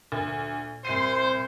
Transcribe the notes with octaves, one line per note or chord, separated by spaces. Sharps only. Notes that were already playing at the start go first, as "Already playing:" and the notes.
D2 A#2
C2 C5 C6 C7 D#7